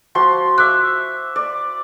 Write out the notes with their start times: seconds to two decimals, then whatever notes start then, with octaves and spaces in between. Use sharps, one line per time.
0.15 F3 F#4 C6
0.58 E5 D6 F#6
1.36 D5